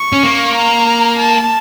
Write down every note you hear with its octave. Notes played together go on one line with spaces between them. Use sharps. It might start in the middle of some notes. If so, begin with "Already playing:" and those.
Already playing: C#6
C#4
A#3
A#5
A5